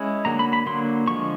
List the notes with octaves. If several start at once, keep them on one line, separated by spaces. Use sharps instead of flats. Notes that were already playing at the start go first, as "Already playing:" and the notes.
Already playing: G#3 C#4 E4
D3 F#3 A#3 A#5
B5
B5
D3 F#3 A#3 C6
D3 F3 G#3 C#6